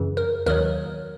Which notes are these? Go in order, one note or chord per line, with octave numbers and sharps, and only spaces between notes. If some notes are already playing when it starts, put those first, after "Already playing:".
Already playing: F#2 C#3 E3
A#4
D#2 D#3 F#3 A#4